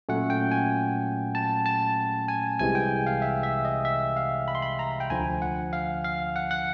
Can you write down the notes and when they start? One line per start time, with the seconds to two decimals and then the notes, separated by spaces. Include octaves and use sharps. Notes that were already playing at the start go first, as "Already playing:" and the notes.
0.09 A#2 F#3 A3 C#4 F#5
0.30 G5
0.51 G#5
1.35 A5
1.66 A5
2.28 G#5
2.59 C2 C3 E3 G#3 G#5
2.75 G5
3.07 F5
3.22 E5
3.43 E5
3.65 D#5
3.85 E5
4.16 F5
4.48 B5
4.55 C6
4.62 B5
4.79 A#5
5.00 G5
5.10 D2 D3 F3 G#5
5.42 F#5
5.73 F5
6.04 F5
6.36 F#5
6.51 F#5